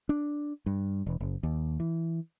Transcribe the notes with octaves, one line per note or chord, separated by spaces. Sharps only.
D4
G2
E1
F#1
D#2
E3